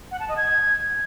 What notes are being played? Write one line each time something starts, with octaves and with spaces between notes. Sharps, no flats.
F#5
A5
D#5
G#6